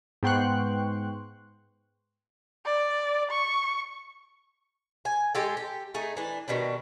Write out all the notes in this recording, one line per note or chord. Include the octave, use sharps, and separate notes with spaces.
G#2 B3 G5 C6 C#6 F#6
D5
C#6
G#5
G#3 G4 A4
G4
A3 D#4 G#4
E3 D4
B2 D#3 G3 D4